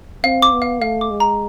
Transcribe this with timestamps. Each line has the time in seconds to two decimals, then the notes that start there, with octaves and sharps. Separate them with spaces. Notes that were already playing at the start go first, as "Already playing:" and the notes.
0.24 C4 F5
0.42 D6
0.52 B3
0.62 F5
0.82 A3 F5
1.01 D6
1.11 G#3
1.20 A#5